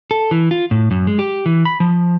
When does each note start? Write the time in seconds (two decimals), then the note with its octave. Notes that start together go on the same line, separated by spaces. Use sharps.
0.11 A4
0.31 E3
0.51 F4
0.71 A2
0.91 F#2
1.07 G#3
1.19 G4
1.46 E3
1.65 B5
1.80 F3